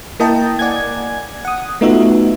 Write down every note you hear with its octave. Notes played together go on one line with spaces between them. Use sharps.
A#3 E4 D#5 G5 A5 A#5
D5 F#5 G#5 G#6
F#5 D#6
A3 B3 D#4 F4 F#4 E5